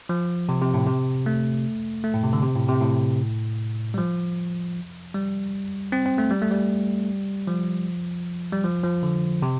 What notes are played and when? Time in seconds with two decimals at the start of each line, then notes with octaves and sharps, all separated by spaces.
0.09 F3
0.49 C3
0.62 C3
0.74 A2
0.87 C3
1.26 A3
2.04 A3
2.14 A2
2.23 C3
2.33 D3
2.43 C3
2.56 A2
2.69 C3
2.81 A2
3.94 G3
3.98 F3
5.15 G3
5.92 C4
6.06 C4
6.18 A3
6.31 G3
6.42 A3
6.51 G3
7.47 F3
8.53 G3
8.64 F3
8.84 F3
9.03 D3
9.42 C3